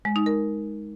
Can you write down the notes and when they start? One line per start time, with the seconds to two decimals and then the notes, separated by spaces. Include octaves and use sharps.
0.05 G#3
0.16 D#4
0.26 A#4